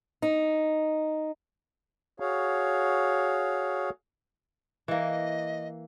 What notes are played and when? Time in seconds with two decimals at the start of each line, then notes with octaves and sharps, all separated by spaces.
0.22 D#4
2.20 F#4 G#4 C#5 F5
4.88 E3 A#3 D#5